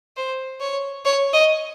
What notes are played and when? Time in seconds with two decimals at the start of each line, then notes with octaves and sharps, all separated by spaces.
0.17 C5
0.61 C#5
1.05 C#5
1.33 D#5